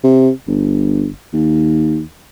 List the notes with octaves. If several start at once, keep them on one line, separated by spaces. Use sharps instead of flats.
C3
G1
D#2